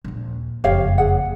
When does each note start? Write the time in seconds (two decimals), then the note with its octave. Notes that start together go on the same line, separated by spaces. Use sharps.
0.04 A#1 D#2
0.64 F#1 F2 G4 C#5 F5
0.98 G#4 F#5